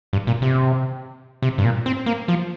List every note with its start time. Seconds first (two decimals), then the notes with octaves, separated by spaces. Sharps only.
0.13 G2
0.27 A#2
0.42 C3
1.42 C3
1.58 G2
1.64 A#2
1.86 C4
2.06 A#3
2.28 F3